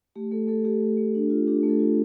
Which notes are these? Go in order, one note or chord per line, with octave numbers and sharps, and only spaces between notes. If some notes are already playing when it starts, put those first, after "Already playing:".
A3 G4
A3 A4
A3 A4
A3 G4
A3
A3
D4
F4
D4 G4
A3
A4
F4